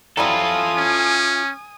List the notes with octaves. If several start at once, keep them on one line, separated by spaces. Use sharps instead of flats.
F#3 G3 E4 F4 A4 G#5 D#6
C#4